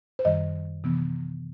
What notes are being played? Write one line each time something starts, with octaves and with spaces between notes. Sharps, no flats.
C5
F#2 D#3 G3 D#5
C3 E3 B3